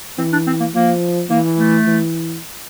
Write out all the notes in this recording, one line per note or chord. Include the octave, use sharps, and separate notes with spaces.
E3 C4
D4
C4
A#3
F3 A#3
E3 A#3
A3
E3